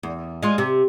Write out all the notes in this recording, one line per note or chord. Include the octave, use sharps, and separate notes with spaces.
E2
G#3 F4
C3